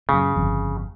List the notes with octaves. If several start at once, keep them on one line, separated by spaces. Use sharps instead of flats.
F#2 A#2 C#3
G1 F2